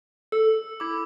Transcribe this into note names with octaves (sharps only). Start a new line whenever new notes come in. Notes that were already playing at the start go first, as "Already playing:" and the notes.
A4 E6
E4 D6